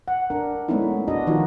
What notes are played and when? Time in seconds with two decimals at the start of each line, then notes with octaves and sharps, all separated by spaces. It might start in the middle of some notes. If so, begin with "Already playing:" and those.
0.08 F#5
0.30 D4 A#4
0.68 G#3 A3 B3 C#4 D#4 E4
1.08 D4 F#4 D#5
1.27 D#3 F3 D#4 F4 F#4